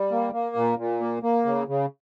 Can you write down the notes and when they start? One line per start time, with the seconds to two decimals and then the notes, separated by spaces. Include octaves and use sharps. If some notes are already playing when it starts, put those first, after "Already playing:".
Already playing: G3
0.12 A#3
0.33 A#3
0.56 A#2
0.78 A#2
1.00 A#3
1.23 A#3
1.45 C#3
1.68 C#3